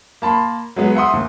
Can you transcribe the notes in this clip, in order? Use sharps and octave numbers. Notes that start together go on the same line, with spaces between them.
A#3 A5 B5 C6
F#3 G#3 B3
E5 F#5 C6 D#6
D#2